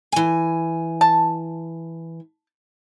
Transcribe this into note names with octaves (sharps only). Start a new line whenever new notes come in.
E3 G#5
A5